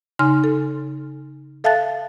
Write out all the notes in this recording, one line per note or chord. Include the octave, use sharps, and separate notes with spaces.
C#3 D#4 G#5 C6 F6
A4
A4 E5 F5 A5 F#6 A6